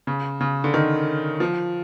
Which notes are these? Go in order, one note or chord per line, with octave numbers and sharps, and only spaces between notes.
C#3
C#3
D3
D#3
F3